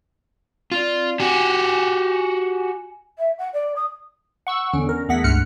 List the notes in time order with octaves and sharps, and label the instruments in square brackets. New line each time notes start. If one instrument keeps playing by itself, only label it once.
[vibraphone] C4 D5 [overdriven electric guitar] F4
[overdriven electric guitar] F#4 G4 [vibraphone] G#5
[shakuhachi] E5
F#5
D5
D#6
[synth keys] F#5 C#6 E6
E2 D3 C#4
A#4
E2 A3 G#4 F#5 A#6 B6
C#2 G2 F6 F#6 C#7